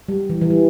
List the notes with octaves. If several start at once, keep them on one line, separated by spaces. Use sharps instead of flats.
G3
E3
E3
G3